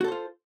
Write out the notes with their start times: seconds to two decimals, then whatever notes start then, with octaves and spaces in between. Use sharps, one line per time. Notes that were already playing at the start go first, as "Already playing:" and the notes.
0.01 F#4
0.04 A4
0.08 C5
0.12 F4